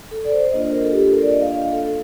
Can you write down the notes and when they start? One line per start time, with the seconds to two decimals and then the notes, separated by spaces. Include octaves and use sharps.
0.11 A4
0.25 D5
0.32 C5
0.51 A#3 D4 F4 D#5
0.62 C5
0.71 A#4
0.82 A4
0.91 G4
1.02 A4
1.11 A#4
1.22 D5
1.31 D#5
1.41 F5
1.52 F5
1.62 F5
1.71 A4